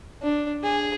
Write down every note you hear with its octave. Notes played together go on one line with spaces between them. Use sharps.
D4
G#4